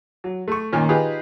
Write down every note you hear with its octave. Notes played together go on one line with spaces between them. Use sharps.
F#3
A3 C#6
A#2 D#3 C#4
D#4 F4 G4 G#4 B4